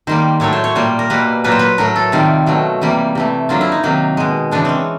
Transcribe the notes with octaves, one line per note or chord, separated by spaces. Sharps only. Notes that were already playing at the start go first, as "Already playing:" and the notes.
D#3 G3 A#3 C5
A2 F#3 A3 C#5
C5
C#5
A#2 G3 A#3 C5
A#4
B2 G3 A#3 B4
A#2 F#3 A#3 B4
C5
B4
A2 F#3 A3 A#4
A4
C3 D#3 G3 F4
B2 F#3 A3
C3 E3 G3 A#3
C3 E3 A3
D3 F#3 A#3 F4
E4
D#4
C3 D#3 F#3 A#3
B2 G#3
C#3 E3 G#3 D4
C4 C#4